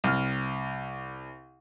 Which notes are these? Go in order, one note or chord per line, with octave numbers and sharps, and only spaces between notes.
C2 F6